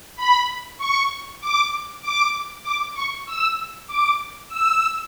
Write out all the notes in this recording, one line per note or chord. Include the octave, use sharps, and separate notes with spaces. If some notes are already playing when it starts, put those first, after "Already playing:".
B5
C#6
D6
D6
D6
C#6
E6
D6
E6